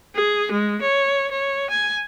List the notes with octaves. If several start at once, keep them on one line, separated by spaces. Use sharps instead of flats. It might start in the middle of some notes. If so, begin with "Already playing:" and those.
G#4
G#3
C#5
C#5
G#5